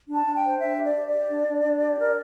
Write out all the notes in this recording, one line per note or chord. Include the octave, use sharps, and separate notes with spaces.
D4
A5
D4
G5
C5
D4 E5
G4
D5
G4
D5
G4
D4
D4
D4
G4
A#4